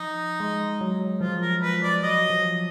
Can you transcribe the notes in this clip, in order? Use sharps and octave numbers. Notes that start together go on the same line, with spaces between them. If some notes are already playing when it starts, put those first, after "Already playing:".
Already playing: F3 D#4
G#3
F#3
F3 F4
A#4
F3 B4
D5
F#3 D#5
F#3
F3